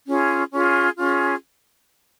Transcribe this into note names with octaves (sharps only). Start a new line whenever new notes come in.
C#4 F4 G#4
C#4 F4 G#4
C#4 F4 G#4